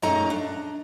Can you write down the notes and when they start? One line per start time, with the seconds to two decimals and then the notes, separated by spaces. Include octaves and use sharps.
0.02 F#2 A#2 G#3 A3 D#4 A#5
0.30 D4